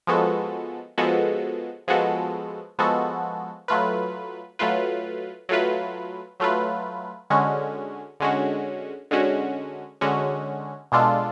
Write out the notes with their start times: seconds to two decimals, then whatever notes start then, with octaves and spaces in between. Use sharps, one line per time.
0.07 F3 G#3 B3 F#4 A4
0.98 F3 G#3 B3 F#4 A4
1.88 F3 G#3 B3 F#4 A4
2.79 F3 G#3 B3 F#4 A4
3.68 F#3 A3 F4 B4
4.59 F#3 A3 F4 B4
5.49 F#3 A3 F4 B4
6.40 F#3 A3 F4 B4
7.30 D3 G#3 C#4 F#4
8.20 D3 G#3 C#4 F#4
9.11 D3 G#3 C#4 F#4
10.01 D3 G#3 C#4 F#4
10.92 B2 G#3 D4 F4 A4